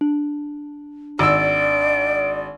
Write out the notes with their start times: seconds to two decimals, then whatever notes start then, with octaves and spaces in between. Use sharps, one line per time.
0.01 D4
1.19 G#1 D5 E6 D7